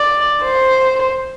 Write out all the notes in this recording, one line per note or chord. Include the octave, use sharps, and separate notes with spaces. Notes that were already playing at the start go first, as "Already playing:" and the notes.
Already playing: D5
C5